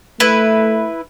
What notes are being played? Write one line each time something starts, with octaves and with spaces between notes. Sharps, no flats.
A3 E4 B4